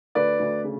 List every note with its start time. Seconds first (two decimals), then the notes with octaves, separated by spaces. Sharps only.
0.15 D2 B4 D5
0.39 D2
0.64 C#3